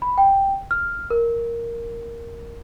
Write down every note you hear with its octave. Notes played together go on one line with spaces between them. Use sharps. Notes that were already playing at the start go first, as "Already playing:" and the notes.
B5
G5
F6
A#4